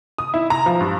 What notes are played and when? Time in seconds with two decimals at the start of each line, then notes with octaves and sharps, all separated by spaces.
0.18 D#6
0.34 E4
0.50 A#5
0.66 F3
0.80 G2